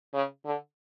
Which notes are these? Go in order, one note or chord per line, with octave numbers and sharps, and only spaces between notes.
C#3
D3